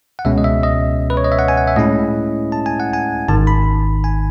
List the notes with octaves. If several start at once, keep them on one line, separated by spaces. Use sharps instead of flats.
F#5
C#2 B2 G#3 C#4 E5
D#5
E5
D#5
B4
C#5
D#5
E5
F#5
G#5
F#5
E5
A2 G#3 C#4 E4 D#5
A5
G#5
F#5
G#5
G#1 G#2 D#3 A5
B5
G#5